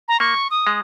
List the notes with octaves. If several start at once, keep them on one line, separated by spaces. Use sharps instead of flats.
A#5
A#3 C#6
D#6
G#3